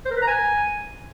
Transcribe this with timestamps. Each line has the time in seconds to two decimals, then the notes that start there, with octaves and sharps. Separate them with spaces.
0.05 C5
0.11 A#4
0.16 B4
0.22 A#5
0.27 G#5